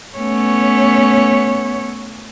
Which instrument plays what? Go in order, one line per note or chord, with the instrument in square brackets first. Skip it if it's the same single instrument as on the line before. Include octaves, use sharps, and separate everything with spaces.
[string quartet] A3 C#4 [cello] B3 C#5